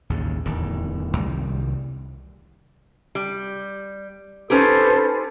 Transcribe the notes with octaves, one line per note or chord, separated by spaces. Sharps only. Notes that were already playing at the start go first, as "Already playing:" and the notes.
A1 D#2 C#3
D1 E2 D#3
C2 D#3 G3
G3
C#4 D#4 G4 A4 B4 C5